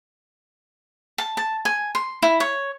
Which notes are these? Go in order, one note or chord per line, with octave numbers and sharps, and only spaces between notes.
A5
A5
G#5
C6
E4
C#5